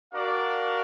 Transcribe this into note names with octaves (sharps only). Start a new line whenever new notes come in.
D4 F#4 A#4 D5 F5